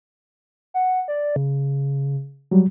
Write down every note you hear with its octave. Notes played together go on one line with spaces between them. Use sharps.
F#5
D5
C#3
F#3 G3